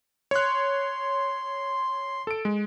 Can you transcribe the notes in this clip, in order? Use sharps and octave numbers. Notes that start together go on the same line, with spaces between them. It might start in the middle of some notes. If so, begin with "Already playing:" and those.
C#5 C6 F#6
A4 D7
G#3